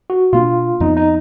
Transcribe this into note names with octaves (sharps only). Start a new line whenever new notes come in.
F#4
B2 A#3 D4 F4
F2 F3 B3 D#4
D#4